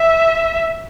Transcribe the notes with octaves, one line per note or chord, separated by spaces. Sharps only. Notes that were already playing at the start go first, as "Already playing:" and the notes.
Already playing: E5